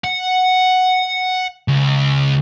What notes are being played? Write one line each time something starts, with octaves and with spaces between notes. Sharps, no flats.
F#5
C#2